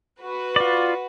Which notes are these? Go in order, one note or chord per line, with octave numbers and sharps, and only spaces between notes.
F#4 B4
F4 D5